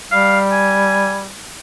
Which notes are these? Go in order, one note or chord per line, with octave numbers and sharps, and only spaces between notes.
G3 F5
G#5